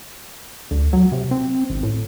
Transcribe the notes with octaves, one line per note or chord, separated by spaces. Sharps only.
D2
F#3
C3
C4
G#1
A2